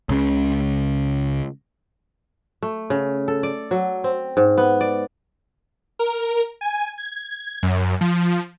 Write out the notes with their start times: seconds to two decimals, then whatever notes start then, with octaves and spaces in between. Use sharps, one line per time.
0.09 C#2 C#3
2.63 A3
2.90 C#3
3.28 A4
3.43 D5
3.71 F#3
4.04 C4
4.37 G#2
4.58 B3
4.81 D5
5.99 A#4
6.61 G#5
6.98 G#6
7.63 F#2
8.01 F3